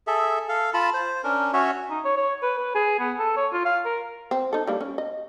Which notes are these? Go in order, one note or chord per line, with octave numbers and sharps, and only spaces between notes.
G#4 A4 E5
A4 F5
F4 A5 B5
C5
C#4 D4 A#4
C#4 F#4 C#5 E5
D#4
C#5
C#5
B4
B4
G#4
B3
A4
C#5
F4
F5
A#4
C4
D#4 A4
G3 A#3 D4
C#4
D#5